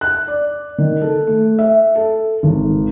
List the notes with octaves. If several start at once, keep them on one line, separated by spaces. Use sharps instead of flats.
F#6
D5
D#3
A4
A3
E5
A4
G#1